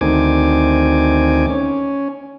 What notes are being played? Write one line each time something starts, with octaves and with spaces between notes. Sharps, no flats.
D2 D#3 C4 G#5 D6
C#4